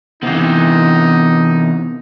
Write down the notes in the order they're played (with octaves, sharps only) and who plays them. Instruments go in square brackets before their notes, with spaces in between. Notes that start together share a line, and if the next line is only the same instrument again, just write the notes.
[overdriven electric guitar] C3 E3 [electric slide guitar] B3 F5 [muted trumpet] D#4